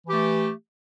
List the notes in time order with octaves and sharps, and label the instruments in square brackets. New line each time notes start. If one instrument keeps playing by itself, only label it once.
[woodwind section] E3
G4
A3